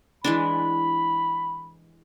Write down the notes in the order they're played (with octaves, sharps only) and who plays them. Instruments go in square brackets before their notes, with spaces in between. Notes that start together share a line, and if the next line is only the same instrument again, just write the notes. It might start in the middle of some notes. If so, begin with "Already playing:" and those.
[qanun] E3 G#3 D4 [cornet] B5